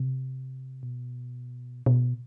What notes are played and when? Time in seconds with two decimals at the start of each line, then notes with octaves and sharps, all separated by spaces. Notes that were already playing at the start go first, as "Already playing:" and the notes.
Already playing: C3
0.83 B2
1.86 B2